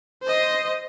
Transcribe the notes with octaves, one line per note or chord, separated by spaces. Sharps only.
C5 D#5